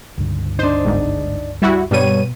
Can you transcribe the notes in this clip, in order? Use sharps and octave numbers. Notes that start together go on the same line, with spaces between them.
C#2 G2 D3
D4 D#4 C5
G1 G#2
G3 E4 F#4
G2 B2 G3 B3 C#5 D#7